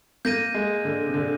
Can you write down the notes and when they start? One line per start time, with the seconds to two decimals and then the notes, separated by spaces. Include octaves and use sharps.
0.25 A#3 G6 A#6 D#7
0.54 G#3
0.85 D3
1.07 C3
1.14 D3